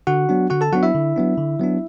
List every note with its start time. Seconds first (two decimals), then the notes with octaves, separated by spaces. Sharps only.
0.07 D3 F#4 F#5
0.29 F#3 B3 D4
0.50 D3 F#4 F#5
0.61 A4 A5
0.73 F#3 B3 D4 F#4 F#5
0.83 E4 E5
0.94 D3
1.16 F#3 B3 D4
1.37 D3
1.59 F#3 B3 D4